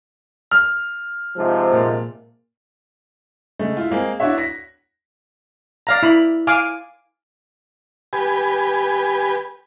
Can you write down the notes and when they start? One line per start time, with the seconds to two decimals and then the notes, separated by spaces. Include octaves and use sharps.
0.51 F6
1.36 G#2 C3 F3
1.72 A#2
3.59 C#3 G#3 A3
3.77 E4 F4
3.90 G#3 A#3 C4 G#4
4.20 D4 E4 F#4 C#5 E5
4.38 A#6 B6
5.87 D5 F5 A#5
6.03 E4 B5
6.47 F5 G#5 D6
8.13 G4 B4 G#5